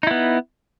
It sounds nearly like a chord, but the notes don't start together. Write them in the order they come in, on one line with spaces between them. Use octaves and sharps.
D#4 E4 B3